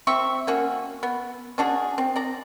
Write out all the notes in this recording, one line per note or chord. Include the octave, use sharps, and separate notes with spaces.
C3 C4 E5 C#6
A#3 C#4 F#4
B3
C#4 D4 F#4 G#4
C4
D5 A#5